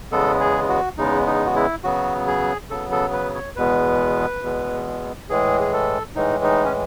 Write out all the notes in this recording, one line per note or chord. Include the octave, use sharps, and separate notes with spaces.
E2 C#3 G#3 B3 A4
G#4
F#4
E2 C#3 G#3 B3 D#4
D#4
F#4
E4
C#3 F#3 B3 F#4
G#4
C#3 F#3 B3 A4
A4
B4
C#5
E2 B2 G#3 B3 B4
E2 B2 G#3 B3
A2 E3 G#3 G#4
G#4
A4
A2 E3 G#3 D#4
D#4
C#4